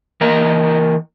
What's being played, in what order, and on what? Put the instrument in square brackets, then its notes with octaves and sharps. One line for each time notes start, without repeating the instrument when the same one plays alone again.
[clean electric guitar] E3 A#3 A#4 D#5 A#5